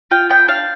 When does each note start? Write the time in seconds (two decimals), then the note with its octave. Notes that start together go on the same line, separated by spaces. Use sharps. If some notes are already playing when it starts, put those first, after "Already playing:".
0.11 F4 G5
0.30 B3 G5
0.48 D4 F5